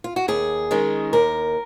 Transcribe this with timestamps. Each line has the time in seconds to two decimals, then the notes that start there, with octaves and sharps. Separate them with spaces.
0.04 F4
0.16 F#4
0.28 D#2 G#4
0.71 D#3 G#3 C#4
1.13 D#2 A#4